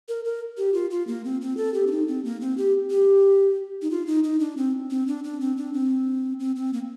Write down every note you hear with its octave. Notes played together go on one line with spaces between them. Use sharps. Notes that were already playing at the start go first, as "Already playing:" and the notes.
A#4
A#4
G4
F4
F4
A#3
C4
C4
A4
G4
D4
D#4
C4
A#3
C4
G4
G4
D#4
F4
D#4
D#4
D4
C4
C4
D4
D4
C4
D4
C4
C4
C4
A#3